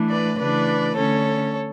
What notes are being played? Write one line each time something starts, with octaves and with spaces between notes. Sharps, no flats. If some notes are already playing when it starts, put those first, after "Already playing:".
Already playing: E3 A3 D4
B4 D5
C#3 E3 A3 D4 B4 D5
D3 A3 C#4 A4 C#5